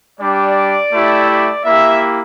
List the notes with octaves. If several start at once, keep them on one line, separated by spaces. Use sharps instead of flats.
G3 D4 G4 D5
A3 E4 G4
D5
A#3 E4 G4 E5